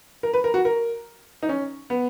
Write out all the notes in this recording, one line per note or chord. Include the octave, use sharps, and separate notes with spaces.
A#4
B4
A#4
F#4
A#4
D#4
C#4
B3